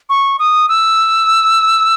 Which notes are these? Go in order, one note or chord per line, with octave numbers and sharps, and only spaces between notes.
C#6
D#6
E6